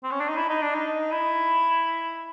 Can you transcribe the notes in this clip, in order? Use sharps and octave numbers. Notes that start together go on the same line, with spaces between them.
C4
C#4
D4
D#4
E4
D#4
D4
D#4
E4